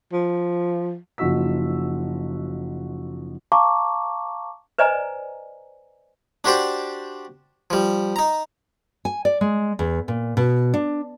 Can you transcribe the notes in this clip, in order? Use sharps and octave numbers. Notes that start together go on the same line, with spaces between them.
F3
F#1 F3 D#4 F#4 E6 B6
F5 A5 A#5 C#6 D6
B4 C5 D5 D#5 G#5 A#5
D4 F#4 G4 C5 D5
F3 G3
D#4 A#5
G#5
D5
G#3
E2
A#2
B2
D4